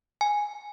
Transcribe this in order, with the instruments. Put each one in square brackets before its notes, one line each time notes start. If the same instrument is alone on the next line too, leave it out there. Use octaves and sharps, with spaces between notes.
[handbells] G#5